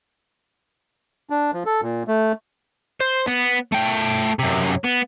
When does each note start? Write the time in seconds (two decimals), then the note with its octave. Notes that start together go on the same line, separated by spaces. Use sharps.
1.30 D4
1.54 F3
1.66 A4
1.82 A#2
2.08 A3
3.00 C5
3.27 B3
3.72 A3 G5
4.39 F#2 C3
4.84 B3